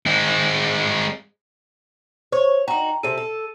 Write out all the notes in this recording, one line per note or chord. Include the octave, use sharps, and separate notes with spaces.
G#3 C4
C5 C#5
D#4 F#4 G5 A#5
C3 A4 D#7
A4